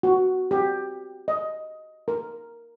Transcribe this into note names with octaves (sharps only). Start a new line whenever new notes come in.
F#4
G4
D#5
A#4